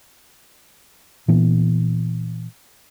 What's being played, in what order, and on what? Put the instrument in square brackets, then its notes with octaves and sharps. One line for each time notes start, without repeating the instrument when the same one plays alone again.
[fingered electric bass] A#2 E3 B3